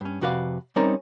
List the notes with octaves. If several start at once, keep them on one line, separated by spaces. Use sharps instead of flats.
G2 C#4
F2 C3 F#4 B4 D5 F5
G3 C4 C#4 D#4 A#4 D5